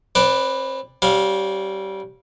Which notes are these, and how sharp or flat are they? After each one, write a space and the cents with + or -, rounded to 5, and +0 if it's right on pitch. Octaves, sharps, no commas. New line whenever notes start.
C4 +35 B4 +0 D5 +0
G3 -20 C#4 -35 F5 +15